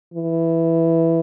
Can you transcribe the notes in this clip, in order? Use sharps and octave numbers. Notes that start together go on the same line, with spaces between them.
E3